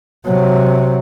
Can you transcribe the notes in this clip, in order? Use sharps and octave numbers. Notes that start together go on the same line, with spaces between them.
C3 F#3